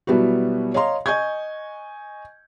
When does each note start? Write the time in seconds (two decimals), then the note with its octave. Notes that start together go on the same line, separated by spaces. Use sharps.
0.07 B2 F#3 G3 B3 E4 F#4
0.74 C#5 D#5 F5 A#5 C6
1.06 D#5 G#5 C#6 G6 G#6